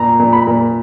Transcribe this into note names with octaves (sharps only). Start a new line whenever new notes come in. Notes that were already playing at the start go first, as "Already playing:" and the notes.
Already playing: A#2 A#5
A#2
B5
A#2